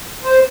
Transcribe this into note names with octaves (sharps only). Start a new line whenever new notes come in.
C5